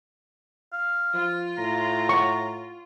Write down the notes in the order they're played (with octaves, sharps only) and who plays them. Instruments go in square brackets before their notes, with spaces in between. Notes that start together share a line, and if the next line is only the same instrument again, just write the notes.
[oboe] F5
[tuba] F3 [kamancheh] F4
[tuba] A2 [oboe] A#5
[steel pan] C#6